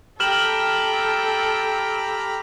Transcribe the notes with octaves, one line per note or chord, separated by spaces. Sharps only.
G4 A4 G5 A#5 B5 F6 E7 F#7